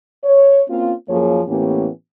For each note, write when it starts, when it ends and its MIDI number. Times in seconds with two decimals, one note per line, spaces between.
0.24 0.61 73
0.70 0.93 58
0.70 0.93 60
0.70 0.93 61
0.70 0.93 65
1.09 1.41 42
1.09 1.41 53
1.09 1.41 58
1.09 1.41 68
1.09 1.41 73
1.48 1.88 45
1.48 1.88 52
1.48 1.88 58
1.48 1.88 59
1.48 1.88 61
1.48 1.88 67